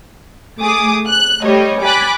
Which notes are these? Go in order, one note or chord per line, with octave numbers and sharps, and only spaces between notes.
A3 G#4 D6 D#6
F#6
G3 A3 C#5 D#5
G#5 B5 D6 F#6 A6 B6